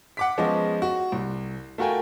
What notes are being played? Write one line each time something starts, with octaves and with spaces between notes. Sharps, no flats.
F#5 D6 B6
F3 G#3 B3 C#4 B4 D#5
F#4
C2
A3 F4 F#4 A#4 G5 G#5